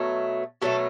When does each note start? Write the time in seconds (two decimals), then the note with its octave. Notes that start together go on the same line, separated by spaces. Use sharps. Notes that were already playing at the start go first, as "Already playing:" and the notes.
Already playing: B2 F#3 A3
0.62 B2 F#3 A3 A4